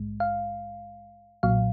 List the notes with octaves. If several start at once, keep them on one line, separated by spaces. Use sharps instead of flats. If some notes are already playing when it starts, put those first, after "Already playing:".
Already playing: A#1 G#2 G#3
F5
B1 A#2 F#3 F5